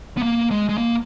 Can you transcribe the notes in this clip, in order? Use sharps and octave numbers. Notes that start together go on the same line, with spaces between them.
B3
A#3
G#3
G#3
A#3